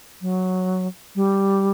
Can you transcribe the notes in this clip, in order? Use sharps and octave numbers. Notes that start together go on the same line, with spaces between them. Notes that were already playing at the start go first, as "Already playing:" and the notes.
F#3
G3